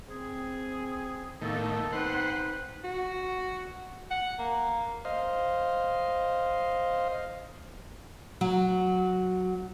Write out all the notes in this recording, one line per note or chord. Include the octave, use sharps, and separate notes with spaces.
C4 G#4
A2 D#3 A#3 B3 A4
C4 D#4 B4 C5 F#5
F#4
F#5
A#3
C5 D#5 F5
F#3